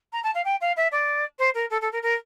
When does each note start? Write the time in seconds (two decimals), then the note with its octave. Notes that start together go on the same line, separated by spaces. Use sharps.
0.12 A#5
0.23 A5
0.34 F5
0.44 G5
0.60 F5
0.76 E5
0.91 D5
1.38 C5
1.54 A#4
1.70 A4
1.81 A4
1.91 A#4
2.02 A#4